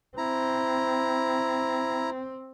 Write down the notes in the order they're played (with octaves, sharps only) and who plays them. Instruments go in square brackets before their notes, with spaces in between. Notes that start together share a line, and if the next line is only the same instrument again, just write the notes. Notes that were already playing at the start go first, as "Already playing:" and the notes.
[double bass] C4 [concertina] E4 A#5